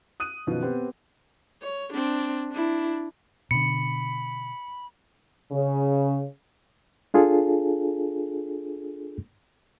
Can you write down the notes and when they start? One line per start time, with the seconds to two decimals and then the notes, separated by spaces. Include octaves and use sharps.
0.20 D#6 F#6 D#7
0.47 F#2 B2 D#3 F3
0.63 B3 C4 G4
1.62 C#5
1.93 C4 D4
2.52 D4 E4
3.51 B2 D3 B5 C#7
5.52 C#3
7.14 D4 F4 G#4 A4